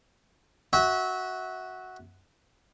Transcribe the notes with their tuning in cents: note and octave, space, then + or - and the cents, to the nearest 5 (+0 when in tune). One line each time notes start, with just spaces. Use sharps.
F#4 +0 E5 -25